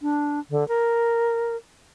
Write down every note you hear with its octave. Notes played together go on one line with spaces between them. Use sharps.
D4
D3
A#4